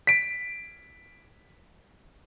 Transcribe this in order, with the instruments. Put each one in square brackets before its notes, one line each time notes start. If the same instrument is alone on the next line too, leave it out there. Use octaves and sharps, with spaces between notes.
[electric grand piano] B6 D7